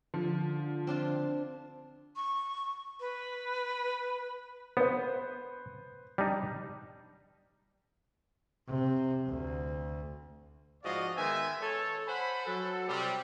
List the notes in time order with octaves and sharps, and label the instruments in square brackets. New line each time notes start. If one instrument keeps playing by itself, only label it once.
[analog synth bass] D3 [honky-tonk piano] F3
[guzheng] C4 D4 F4
[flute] C#6
B4
[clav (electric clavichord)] B3 [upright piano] B4 C5
[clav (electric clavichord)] G3 D4 D#4
[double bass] C3
D2
[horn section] G#2 F3 F#4 D5 D#5 F5
D#3 G#3 B3 E5 G#5
A4 C#5
C5 F#5 G#5 B5
F#3 A4
C3 G3